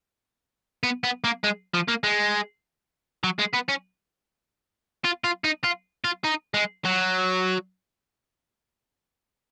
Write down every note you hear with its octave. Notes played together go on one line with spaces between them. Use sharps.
B3
B3
A#3
G#3
F3
A#3
G#3
F#3
G#3
B3
C#4
F4
F4
D#4
F4
F4
D#4
G#3
F#3